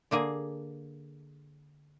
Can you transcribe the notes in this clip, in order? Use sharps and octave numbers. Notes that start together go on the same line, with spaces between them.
D3 A#3 G#4